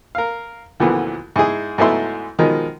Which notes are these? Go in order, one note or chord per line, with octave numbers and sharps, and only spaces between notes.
A#4 F5
D2 A#2 D3 E3 F3 B3
G#2 E4 G#4
G#2 F#3 A3 B3 E4 C6
B2 D#3 F3 G#3